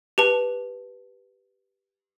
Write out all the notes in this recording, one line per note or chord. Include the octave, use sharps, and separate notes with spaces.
G4 B4 A5